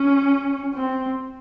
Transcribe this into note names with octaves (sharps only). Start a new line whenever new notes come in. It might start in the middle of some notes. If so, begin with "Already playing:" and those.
Already playing: C#4
C4